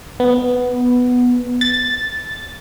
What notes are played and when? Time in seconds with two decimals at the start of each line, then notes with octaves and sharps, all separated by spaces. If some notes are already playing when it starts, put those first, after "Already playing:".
0.20 B3
1.61 A6